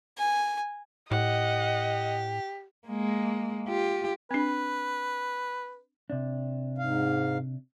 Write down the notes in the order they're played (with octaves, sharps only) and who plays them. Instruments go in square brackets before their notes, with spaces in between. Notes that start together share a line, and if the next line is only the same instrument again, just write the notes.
[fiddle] G#5
[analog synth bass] A2 [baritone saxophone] G4 [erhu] D#5 [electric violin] F#5
[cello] G#3 A#3
F4 G4
[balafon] C4 D4 [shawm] B4
[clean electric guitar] C3 D4
[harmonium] G#2 F5